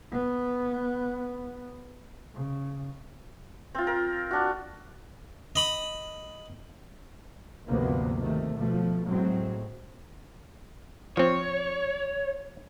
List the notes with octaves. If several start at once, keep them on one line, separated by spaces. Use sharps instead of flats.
B3
C#3
C4 F4
A#4
D4 F#4
D#5 B5 D#6
G1 D2 C3 F3 A#3 B3
C3 D#3 A3
B2 F3 A3
A2 F#3 G#3 C4
F3 C4 C#5